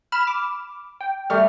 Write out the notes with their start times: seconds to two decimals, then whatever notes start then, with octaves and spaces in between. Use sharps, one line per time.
0.12 B5 F6 E7
0.27 D6
1.01 G5
1.30 G3 A3 F6